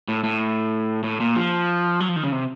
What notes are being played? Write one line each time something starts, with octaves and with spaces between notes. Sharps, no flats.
A2
A2
A2
A#2
F3
F#3
F3
D#3
C#3
C3